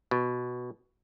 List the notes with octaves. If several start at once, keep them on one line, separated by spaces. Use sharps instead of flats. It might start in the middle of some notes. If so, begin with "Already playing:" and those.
B2